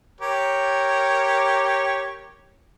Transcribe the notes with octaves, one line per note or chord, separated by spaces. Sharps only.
G4 A#4 C#5